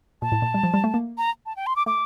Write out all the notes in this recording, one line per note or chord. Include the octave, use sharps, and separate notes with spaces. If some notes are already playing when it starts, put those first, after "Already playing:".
A#2 A5
A2
A#2
G3
F3
G3
A3
A#3
A#5
A5
G5
C6
D6
A3 D6